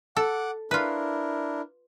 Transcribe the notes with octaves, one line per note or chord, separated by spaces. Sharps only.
A4 F#5 D6
D4 E4 F4 A#4 B4